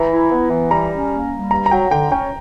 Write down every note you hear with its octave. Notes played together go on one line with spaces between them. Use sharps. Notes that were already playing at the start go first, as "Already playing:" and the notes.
Already playing: E3 A#5
E4
B3
E3
G3 A#5
C#4
A#3
G3
G2 A#5
A#5
F#3 G5
D3 G5
C#4 G5